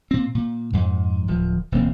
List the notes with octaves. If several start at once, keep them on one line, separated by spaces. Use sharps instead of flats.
A#2 C4
A#2
F2 G#2
D1 F3
E1 D2 A#3 C4